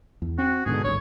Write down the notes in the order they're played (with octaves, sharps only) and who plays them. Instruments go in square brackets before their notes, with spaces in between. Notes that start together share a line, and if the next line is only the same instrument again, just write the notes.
[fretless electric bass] E2
[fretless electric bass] C4 [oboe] F#4
[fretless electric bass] G#2 B2 D3 [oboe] G#4
[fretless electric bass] G#1 D2 G2 [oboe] C#5